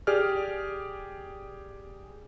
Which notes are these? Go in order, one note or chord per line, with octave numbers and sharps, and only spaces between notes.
G4 G#4 D5 F6